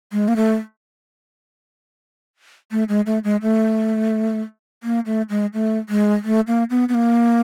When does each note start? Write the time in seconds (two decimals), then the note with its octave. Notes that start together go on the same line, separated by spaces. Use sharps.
0.12 G#3
0.28 A#3
0.36 A3
2.71 A3
2.89 G#3
3.06 A3
3.24 G#3
3.42 A3
4.83 A#3
5.06 A3
5.30 G#3
5.54 A3
5.89 G#3
6.24 A3
6.47 A#3
6.70 B3
6.89 B3
6.94 A#3